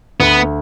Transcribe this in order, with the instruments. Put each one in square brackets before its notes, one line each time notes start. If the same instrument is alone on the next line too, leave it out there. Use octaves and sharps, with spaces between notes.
[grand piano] D2 [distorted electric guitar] B3